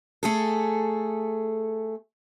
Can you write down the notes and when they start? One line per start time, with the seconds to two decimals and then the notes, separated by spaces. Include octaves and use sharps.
0.23 A3 G#4 A4